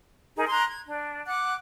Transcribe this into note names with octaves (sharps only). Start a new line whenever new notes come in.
D#4 G#4 A#4
A#5 C6 F#6 G#6
G#6
D4
F#5 D6 F#6